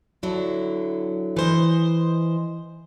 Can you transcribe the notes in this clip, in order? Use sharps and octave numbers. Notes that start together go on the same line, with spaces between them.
D3 F#3 E4
E3 C5 D#5